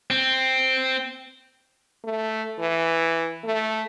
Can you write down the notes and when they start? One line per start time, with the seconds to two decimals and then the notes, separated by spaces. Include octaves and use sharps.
0.10 C4
2.04 A3
2.59 E3
3.44 A3